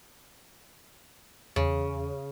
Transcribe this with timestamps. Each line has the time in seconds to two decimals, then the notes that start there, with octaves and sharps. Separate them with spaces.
1.56 E2 C#3